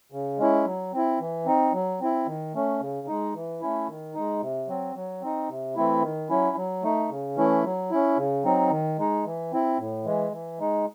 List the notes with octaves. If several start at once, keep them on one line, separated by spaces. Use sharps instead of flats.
C#3
G#3 C#4 E4
F#3
C4 E4
E3
C4 D#4
F#3
C4 E4
D#3
A3 C#4
C#3
G#3 D#4
E3
A3 C#4 E4
D#3
G#3 D#4
C3
F#3 C4
F#3
C4 D#4
C3
E3 A3 C4 E4
D#3
F#3 C#4 E4
F#3
A3 D#4
C#3
E3 A3 C#4 E4
F#3
C#4 E4
C#3
F#3 C4 D#4
D#3
G#3 D#4
E3
C4 E4
A2
E3 G#3
E3
G#3 D#4